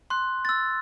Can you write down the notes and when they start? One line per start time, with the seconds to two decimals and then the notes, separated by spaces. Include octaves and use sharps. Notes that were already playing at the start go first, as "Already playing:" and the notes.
0.10 C6 F#6
0.45 E6 A6